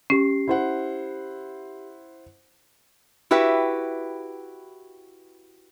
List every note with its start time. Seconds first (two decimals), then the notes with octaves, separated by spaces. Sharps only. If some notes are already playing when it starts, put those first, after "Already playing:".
0.10 C#4 G4 C7
0.48 E4 C5 F#5
3.31 E4 F#4 G4 B4 E5